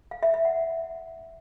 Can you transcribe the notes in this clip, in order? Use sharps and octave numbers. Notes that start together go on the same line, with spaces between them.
F5
E5
E5
F#5